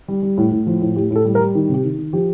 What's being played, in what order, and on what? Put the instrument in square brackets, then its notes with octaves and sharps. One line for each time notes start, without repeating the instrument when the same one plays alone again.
[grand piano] G3
G3
A2
A2
F3
A2
A2 G4
A2 A4
G3
A#4
G3
D#3
C3 G4
D#3
D#3
F3 G4